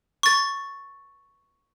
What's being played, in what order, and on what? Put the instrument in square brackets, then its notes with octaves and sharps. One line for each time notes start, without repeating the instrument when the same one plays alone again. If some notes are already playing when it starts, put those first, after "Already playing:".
[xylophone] C#6 A6